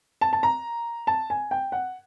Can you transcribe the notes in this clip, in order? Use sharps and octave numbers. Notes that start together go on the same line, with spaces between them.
A5
A5
A#5
A5
G#5
G5
F#5